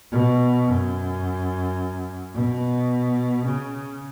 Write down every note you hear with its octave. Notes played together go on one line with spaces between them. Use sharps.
B2
F#2
B2
C#3